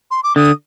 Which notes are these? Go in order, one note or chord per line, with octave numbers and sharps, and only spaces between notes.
C6
D6
D3 D#6